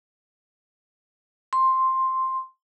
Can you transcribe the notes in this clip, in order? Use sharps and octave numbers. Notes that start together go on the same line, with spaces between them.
C6